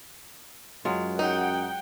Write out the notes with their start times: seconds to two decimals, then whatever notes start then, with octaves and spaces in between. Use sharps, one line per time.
0.85 F#2 F#3 G#3 F4
1.19 D#4 F#5 G5